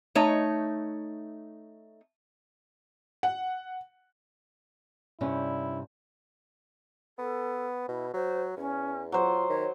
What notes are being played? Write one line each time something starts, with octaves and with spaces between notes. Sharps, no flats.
A3 D#4 C#5
F#5
G2 C3 C#4 E4
B3 A4
B2 E4
F#3 C5
E2 C#4
F#3 F4 C5
D#3 C#5